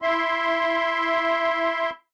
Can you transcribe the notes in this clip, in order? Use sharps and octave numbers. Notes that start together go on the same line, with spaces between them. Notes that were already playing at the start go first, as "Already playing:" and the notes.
E4 E5 C6